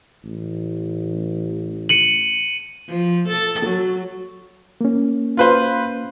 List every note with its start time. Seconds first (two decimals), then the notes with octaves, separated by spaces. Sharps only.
0.24 A1
1.89 C#7 D#7 F#7
2.88 F3
3.28 A4
3.66 F#3
4.81 A#3 C#4
5.37 F4 B4 C5